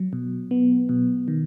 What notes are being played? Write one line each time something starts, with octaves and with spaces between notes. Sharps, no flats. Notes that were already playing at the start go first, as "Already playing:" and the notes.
Already playing: F#3
B2
B3
B2
D#3